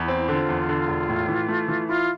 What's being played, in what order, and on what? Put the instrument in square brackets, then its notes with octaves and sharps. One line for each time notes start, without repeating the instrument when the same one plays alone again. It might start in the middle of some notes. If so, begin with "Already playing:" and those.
Already playing: [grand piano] E2 [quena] E4
[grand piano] C4
[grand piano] D3 [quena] F4 A4
[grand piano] E2
D3
E1
A2
E3
A3
E3
[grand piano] E4 [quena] F4